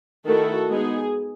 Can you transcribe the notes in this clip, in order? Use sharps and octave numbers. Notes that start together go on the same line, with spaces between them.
D#3 A3 E4 F#4 A4
G#3 B3 D#4 G#4